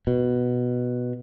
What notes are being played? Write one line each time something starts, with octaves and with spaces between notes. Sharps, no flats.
B2